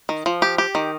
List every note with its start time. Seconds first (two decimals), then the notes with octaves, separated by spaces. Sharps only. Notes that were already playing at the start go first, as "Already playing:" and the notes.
0.09 D#3
0.26 F3
0.42 G4
0.58 G4
0.75 D#3